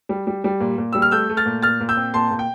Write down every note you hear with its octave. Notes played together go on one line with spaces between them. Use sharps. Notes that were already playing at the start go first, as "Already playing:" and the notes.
G3
G3
G3
A#2
A#2
G3 E6
F6
A3 E6 G6
A3
F6 A6
A#2
A#2 F6 A6
A#2
E6 G6
C4
A#2 A5 C6
A#2
G5